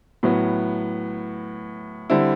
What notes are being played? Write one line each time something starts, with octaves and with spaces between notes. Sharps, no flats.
A2 F#3 B3
D3 G3 C4 E4